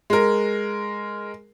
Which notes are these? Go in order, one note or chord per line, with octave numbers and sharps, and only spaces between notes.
G#3 A#4